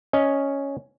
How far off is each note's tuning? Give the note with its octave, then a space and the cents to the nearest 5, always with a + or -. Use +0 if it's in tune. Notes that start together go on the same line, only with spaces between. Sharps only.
C#4 +0 D#5 +0